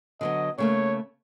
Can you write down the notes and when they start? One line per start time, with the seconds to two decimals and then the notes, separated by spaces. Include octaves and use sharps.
0.21 D3 F#3 B3 D#5
0.58 C#3 A3 A#3 C#5